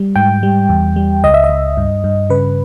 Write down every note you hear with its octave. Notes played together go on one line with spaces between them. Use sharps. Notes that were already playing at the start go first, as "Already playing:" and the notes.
Already playing: G3
G#2 G5
G3
E2
G3
C#2 D#5
E5
D#5
C#2
G2
G2
C#3 B4